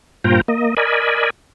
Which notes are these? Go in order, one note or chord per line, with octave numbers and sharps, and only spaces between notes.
G2 A#2 F4 C5 G5 A#5
A#3 D#5
A#4 D5 D#5 G#5 B5